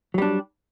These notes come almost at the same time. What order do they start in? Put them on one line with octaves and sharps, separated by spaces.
F#3 G3 D4